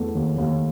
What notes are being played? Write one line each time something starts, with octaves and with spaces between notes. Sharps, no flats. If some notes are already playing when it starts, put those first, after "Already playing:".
Already playing: E2 A3
D#2
D#2